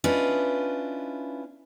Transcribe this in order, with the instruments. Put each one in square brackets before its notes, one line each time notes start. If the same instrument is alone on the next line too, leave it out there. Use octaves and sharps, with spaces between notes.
[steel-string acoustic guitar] C#4 D4 E4 F4 B4 D#5